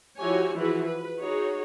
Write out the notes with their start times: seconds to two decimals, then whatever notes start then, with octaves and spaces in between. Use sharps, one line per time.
0.18 F3 E4 F#4 G4 C#5 G#5
0.56 E3 F3 E4 F#4 G#4 B4
0.87 B4
1.20 D#4 F#4 G#4 C#5